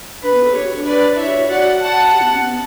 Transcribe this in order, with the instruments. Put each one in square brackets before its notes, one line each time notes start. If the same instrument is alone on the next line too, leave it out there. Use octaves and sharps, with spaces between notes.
[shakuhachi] D4 [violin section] B4
[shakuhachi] B3
A4
[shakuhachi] G4 [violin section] C#5
[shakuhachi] F#4
D4
[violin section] B4 D5
[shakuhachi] E4 [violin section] C#5 E5
[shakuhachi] G4
E4
F#4
[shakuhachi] F#4 [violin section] D5 F#5
[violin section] F#5 A5
[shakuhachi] G4
B3
C#4
B3